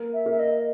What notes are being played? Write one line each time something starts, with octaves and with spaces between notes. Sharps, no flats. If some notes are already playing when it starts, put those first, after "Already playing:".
Already playing: A#3
E5
A#3 E5
D#5